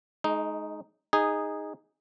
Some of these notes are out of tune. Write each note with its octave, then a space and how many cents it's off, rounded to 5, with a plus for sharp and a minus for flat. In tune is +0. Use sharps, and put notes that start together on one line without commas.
G#3 +30 D#4 +0
D#4 +0 G#4 -10